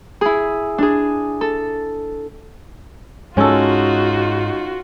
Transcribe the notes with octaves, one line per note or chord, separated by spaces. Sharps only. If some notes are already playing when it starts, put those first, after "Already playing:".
E4 G#4
D4 G#4
A4
G#2 G#3 C#4 D#4 F4 F#4 A4